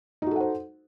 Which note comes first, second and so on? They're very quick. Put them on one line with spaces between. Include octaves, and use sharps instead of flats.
D#4 F#4 A4 F#5 C5